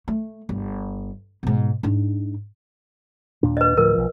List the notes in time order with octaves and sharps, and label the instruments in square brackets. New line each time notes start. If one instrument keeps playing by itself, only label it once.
[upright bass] A3
G1
G#2 B2
G#2 D4
[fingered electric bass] D#2 A#2 D4
[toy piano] B4 D#5
[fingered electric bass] D2 A2 F3 [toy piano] A#4
[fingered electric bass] B1 F3